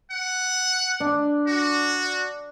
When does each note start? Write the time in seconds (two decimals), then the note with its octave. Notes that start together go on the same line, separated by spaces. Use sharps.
0.11 F#5
1.00 D4
1.47 F#4